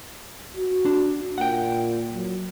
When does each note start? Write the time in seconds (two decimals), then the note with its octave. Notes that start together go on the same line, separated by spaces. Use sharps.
0.57 F#4
0.85 D4
1.38 A#2 F#5 G5
2.12 F#3